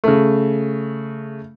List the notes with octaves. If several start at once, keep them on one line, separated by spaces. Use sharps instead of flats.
C#3 A3